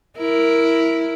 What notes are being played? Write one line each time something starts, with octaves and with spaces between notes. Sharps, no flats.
E4 A#4